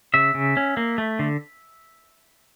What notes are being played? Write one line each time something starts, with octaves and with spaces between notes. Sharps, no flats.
C#3 E5
C#3
C#4
A#3
A3
D3